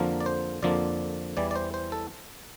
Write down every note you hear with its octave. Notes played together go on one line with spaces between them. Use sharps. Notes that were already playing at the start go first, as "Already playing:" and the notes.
Already playing: F2 D3 F3 A#3 A#4
D5
C5
F2 D3 F3 A#3 D5
E2 E3 G3 D5
D5
C5
C5
A4